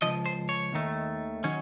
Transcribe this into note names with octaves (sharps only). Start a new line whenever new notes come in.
C#2 C#3 F3 D#5
C5
C#5
D#2 D#3 A3
D#3 F#3 C#4 C#5